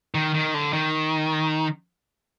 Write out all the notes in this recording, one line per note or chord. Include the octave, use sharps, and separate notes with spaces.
D#3
D#3
D3
D#3